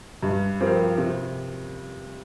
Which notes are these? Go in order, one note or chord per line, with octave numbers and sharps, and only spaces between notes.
G2
F3 C4 G4 A#4
C3